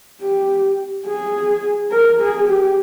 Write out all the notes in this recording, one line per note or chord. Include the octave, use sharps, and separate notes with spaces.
G4
G#4
A#4
G#4
G4